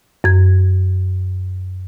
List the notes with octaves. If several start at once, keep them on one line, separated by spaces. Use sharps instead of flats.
F#2 G#6